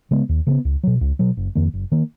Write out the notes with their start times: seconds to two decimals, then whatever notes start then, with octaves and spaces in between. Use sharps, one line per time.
0.11 C#3 G#3 B3
0.29 D#2
0.47 C#3 G#3 B3
0.65 C#2
0.83 B2 F#3
1.01 C#2
1.19 B2 F#3
1.37 F#1
1.55 F2 D#3 A#3
1.73 F#1
1.92 D#3 A#3